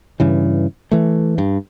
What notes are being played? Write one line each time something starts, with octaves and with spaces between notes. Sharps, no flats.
G2 C#3 E3
E3 A3
G2